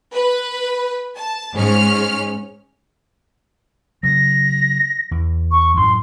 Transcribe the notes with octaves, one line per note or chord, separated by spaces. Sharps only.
B4
A5
G#2 C#4 F6
C#3 F#3 A#6
E2
C#6
F#2 A2 F#3 C6